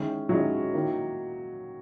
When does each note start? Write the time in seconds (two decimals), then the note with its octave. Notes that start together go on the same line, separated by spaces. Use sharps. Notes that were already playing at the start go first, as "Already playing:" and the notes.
Already playing: D#3 G#3 C#4 E4
0.29 D#3 F#3 G#3 C#4 E4
0.74 D#3 A#3 E4